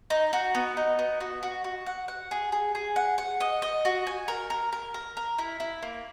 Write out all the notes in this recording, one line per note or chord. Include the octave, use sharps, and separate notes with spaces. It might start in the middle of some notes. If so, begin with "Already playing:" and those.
D#4
F#4
B3
D#4
B3
F#4
F#4
F#4
F#5
F#5
G#4
G#4
G#4
F#5
F#5
D#5
D#5
F#4
G#5
A#4
A#4
A#4
A#4
A#4
E4
E4
A#3